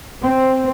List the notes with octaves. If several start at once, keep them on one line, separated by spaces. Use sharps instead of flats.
C4